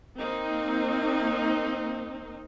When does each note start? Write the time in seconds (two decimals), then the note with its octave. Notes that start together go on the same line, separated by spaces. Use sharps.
0.17 A#3 C4 D#4